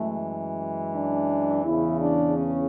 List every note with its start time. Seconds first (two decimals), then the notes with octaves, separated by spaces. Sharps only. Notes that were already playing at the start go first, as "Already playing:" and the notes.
Already playing: F#2 E3 G#3 A3
0.95 D4
1.64 E2 C#3 E3 E4
1.99 D4
2.34 C#4